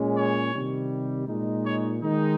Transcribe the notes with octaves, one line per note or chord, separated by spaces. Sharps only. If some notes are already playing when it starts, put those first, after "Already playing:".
Already playing: A#2 G#3 C#4
C#5
C3 D#3 G3
A#2 G#3 D#4
C#5
D#3 G#3 D#4